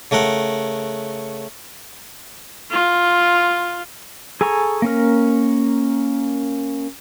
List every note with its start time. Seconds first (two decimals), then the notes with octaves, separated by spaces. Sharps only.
0.11 C#3 A3 A#4 F#5
2.71 F4
4.41 G#4 A4 G#5 A#5 C#6
4.82 A#3 C#4 A#4